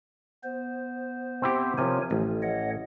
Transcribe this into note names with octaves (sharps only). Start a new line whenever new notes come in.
B3 C5
C4 E4 G4
C3 F3 A#4 C#5 G#5
A1 F3
C#5 D#5 F#5